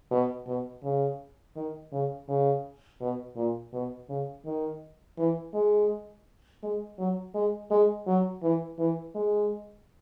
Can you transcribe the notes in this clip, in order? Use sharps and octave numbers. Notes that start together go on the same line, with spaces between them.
B2
B2
C#3
D#3
C#3
C#3
B2
A#2
B2
C#3
D#3
E3
G#3
G#3
F#3
G#3
G#3
F#3
E3
E3
G#3